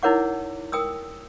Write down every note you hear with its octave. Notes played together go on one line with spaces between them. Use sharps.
D#4 E4 A#4 C#5 F#5 D6
A#4 G5 D#6 E6